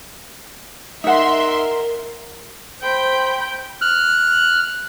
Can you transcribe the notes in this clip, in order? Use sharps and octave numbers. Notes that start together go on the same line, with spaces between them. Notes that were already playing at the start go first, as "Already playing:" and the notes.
D#4 A#4 E5 F#5 C6
C5 G5 B5
F6 F#6